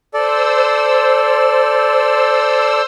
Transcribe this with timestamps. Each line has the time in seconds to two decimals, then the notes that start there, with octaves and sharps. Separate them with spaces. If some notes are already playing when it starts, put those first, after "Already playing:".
0.14 A4 C5 D5 E6